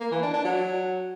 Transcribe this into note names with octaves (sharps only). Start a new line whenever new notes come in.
A#3
E3
D4
D4
F#3